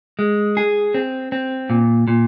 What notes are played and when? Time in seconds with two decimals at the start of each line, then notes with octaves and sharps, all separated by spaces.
0.19 G#3
0.57 G#4
0.94 C4
1.32 C4
1.70 A#2
2.08 A#2